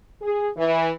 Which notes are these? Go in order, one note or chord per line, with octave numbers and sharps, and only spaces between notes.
G#4
E3